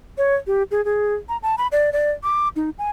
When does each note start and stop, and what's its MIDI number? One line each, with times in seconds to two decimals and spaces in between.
0.18 0.36 73
0.47 0.63 67
0.71 0.84 68
0.85 1.14 68
1.29 1.37 82
1.43 1.56 81
1.58 1.67 83
1.72 1.92 74
1.93 2.12 74
2.23 2.48 86
2.56 2.70 63
2.78 2.90 80